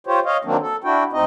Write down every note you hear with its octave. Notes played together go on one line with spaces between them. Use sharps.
F4 G4 C5 C#5
C#5 D#5 F5
D#3 F#3 A#3 C4 D4
A4
D4 E4 F#4 G5
D2 C4 D#4 D#5